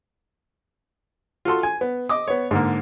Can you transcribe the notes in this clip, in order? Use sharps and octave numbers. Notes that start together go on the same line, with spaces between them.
F4 F#4 A4 C6
G#5
B3
D#5 D6 D#6
B3 C#5
G#2 D3 A#3